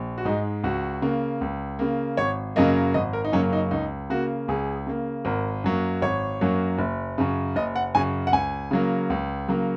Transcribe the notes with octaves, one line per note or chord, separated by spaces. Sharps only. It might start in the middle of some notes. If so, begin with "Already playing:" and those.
Already playing: A#1
F#4
G#2 G#3 D#4
C#2 F#4
C#3 A#3
C#2
C#3 A#3
G#1 C#5
F#2 C#3 F#3 A#3 D#5
G#1 D#5
A#4
D#4
F#2 C#3 F#3 A#3 C#4
D#4
C#2 D#4
C#3 A#3 F#4
C#2 G#4
C#3 A#3
G#1 A#4
F#2 F#3 A#3
G#1 C#5
F#2 F#3 A#3
F#1
F#2 C#3
F#1 D#5
F#5
F#2 C#3 G#5
F#5
C#2 G#5
C#3 F#3 A#3
C#2
C#3 F#3 A#3